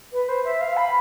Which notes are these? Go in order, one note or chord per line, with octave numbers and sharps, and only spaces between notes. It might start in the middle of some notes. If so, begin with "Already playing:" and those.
B4
C5
E5
F5
B5